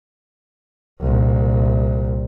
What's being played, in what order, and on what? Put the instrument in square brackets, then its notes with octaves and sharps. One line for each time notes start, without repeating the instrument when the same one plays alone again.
[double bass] C2 A#2